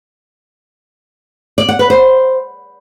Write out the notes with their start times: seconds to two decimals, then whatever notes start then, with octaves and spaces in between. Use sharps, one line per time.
1.58 D5
1.69 F#5
1.79 B4
1.90 C5